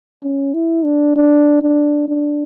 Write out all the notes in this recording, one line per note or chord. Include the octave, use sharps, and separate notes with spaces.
C#4
E4
D4
D4
D4
D4